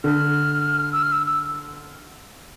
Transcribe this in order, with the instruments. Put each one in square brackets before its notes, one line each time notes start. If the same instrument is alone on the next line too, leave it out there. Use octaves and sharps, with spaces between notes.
[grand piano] D3 [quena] F6
[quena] E6
F6
E6
E6